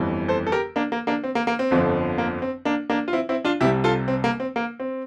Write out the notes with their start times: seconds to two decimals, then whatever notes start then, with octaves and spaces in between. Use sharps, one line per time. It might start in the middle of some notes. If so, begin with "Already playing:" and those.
Already playing: G1 F2 E3 G3
0.28 A4 C5
0.47 A4
0.52 G4 A#4
0.76 A#3 D4
0.92 A#3
1.07 A#3 D4
1.24 C4
1.35 A#3
1.47 A#3
1.59 C4
1.71 G1 F2 D3 F3
2.18 A#3
2.42 C4
2.65 A#3 D4
2.90 A#3 D4
3.08 F4
3.13 C4 E4
3.29 C4 E4
3.45 D4 F4
3.60 C2 C3 G3 E4 G4
3.84 F4 A4
4.08 C4
4.24 A#3
4.40 C4
4.56 A#3
4.80 C4